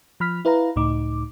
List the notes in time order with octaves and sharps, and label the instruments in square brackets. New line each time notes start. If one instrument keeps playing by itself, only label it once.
[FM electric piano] F3 B5 F6 B6
E4 B4 F5 A#5
C#2 A2 D#4 D6